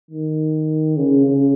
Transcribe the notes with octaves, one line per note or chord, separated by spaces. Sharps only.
D#3
C#3
C#3